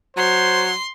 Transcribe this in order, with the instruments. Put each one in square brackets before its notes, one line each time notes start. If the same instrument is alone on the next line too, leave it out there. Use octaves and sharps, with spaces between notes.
[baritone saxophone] F#3 [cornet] C5 [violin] C6